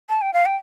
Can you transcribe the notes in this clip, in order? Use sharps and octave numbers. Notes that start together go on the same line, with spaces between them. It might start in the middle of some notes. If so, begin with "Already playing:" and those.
A5
G5
F5
G5